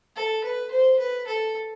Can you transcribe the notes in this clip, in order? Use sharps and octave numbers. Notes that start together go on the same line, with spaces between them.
A4
B4
C5
B4
A4